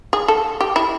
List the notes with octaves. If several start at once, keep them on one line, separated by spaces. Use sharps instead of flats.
G#4
A4
G4
E4